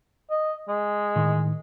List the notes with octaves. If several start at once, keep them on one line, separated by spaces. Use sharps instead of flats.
D#5
G#3
A2 D#3